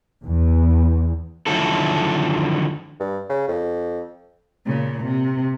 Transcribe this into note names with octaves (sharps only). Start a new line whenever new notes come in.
E2
D3 D#3 F3 F#3 E4 A4
G2
C#3
F2
A#2 C#3
C3